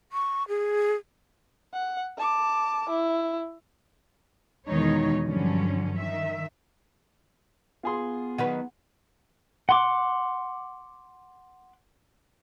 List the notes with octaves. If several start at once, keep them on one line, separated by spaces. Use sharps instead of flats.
C#6
G#4
F#5
A5 D6
E4
E2 B2 D#3 G#3 D#4 C#5
G2 D3 F3 F#3 C#4
D#3 E5
B3 F4 G#4 C6
D#3 F#3 B4 F#5
F#5 C6 D6